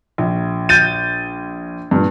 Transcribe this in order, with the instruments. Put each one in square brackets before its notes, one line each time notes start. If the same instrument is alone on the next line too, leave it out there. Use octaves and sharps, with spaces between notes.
[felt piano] A#1
[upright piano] G6 A6 D#7
[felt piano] G2 A#2